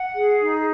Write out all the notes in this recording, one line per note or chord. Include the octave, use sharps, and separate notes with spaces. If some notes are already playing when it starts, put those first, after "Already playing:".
Already playing: F#5
G#4
D#4